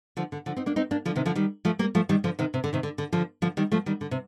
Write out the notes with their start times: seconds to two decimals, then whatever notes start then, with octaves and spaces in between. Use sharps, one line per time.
0.17 D3 F3
0.32 D3
0.46 D3 F3
0.56 C4 D#4
0.66 A#3 D4
0.76 C4 D#4
0.91 A#3 D4
1.05 D3 F3
1.16 C3 D#3
1.26 D3 F3
1.35 D#3 G3
1.65 F3 A3
1.79 G3 A#3
1.95 F3 A3
2.09 D#3 G3
2.24 D3 F3
2.39 C3 D#3
2.54 C3
2.64 D3
2.73 C3 D#3
2.83 D3
2.98 D3
3.13 D3 F3
3.42 D3 F3
3.57 D#3 G3
3.72 F3 A3
3.86 D#3 G3
4.01 D3
4.11 C3